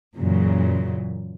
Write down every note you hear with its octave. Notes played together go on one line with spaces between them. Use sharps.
F#2 A#2 C#3 E3 F#3